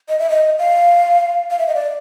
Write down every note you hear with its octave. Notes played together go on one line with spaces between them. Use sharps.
D#5
E5
D#5
F5
F5
E5
D#5
D5